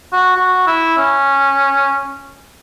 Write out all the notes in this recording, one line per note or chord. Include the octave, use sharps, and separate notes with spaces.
F#4
F#4
E4
C#4